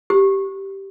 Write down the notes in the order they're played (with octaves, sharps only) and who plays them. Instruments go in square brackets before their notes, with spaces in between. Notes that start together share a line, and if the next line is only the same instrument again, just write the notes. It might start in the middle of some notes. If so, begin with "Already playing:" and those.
[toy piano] G4